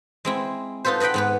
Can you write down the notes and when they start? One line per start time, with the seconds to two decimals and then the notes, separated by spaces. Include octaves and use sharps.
0.25 G#3 C4 E4
0.85 D#4 F4 A4 B4 C5
1.00 B4 D#5 F#5 G5 B5
1.14 G#2 B3 B4